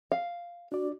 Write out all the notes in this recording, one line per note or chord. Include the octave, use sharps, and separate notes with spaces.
F5
D4 F#4 D5